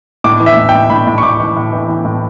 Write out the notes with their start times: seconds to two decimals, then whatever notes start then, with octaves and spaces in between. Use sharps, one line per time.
0.24 A2 D6
0.40 E3
0.46 E5
0.57 A2
0.69 G5
0.74 A2
0.90 A2 B5
1.07 A2
1.18 C#6
1.23 A2 D6
1.39 E3
1.56 A2
1.73 E3
1.88 E3
2.05 A2